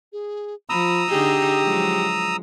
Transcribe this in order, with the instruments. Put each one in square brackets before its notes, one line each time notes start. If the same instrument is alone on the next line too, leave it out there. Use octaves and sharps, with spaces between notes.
[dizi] G#4
[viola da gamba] F3 [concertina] A#5 D#6 E6 [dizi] B5
[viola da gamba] D3 D#4 G#4 [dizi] G4
[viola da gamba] F3 F#3 G#3